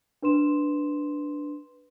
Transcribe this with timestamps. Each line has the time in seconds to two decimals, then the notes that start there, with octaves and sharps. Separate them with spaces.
0.22 D4 B4 C6 E7